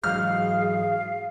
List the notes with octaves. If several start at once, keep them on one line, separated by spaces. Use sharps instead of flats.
G#2 E3 F#3 G#4 F5 F6